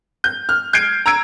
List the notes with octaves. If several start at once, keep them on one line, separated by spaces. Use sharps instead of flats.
G6
F6
G6 G#6 C7 D7
A#5 E6 G#6 D7